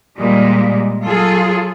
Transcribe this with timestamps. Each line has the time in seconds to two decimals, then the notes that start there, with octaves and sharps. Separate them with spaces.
0.18 A#2 G3 G#3
1.04 F#3 F4 G#4 A4